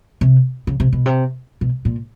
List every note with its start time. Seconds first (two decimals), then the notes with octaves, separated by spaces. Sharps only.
0.21 C3
0.67 C#3
0.80 C3
0.93 B2
1.06 C3
1.61 B2
1.85 A#2